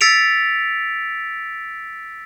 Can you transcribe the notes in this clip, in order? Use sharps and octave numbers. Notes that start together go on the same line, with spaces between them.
E6 A6 B6 C#7 D7 F7